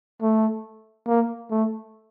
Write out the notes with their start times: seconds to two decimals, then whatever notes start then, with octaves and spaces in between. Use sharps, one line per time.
0.21 A3
1.07 A#3
1.50 A3